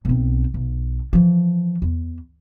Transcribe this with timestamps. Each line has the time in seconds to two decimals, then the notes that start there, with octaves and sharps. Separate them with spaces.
0.05 B1 C4
0.54 B1
1.13 E3 F3
1.82 E2